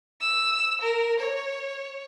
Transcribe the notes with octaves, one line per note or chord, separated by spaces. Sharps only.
E6
A#4
C#5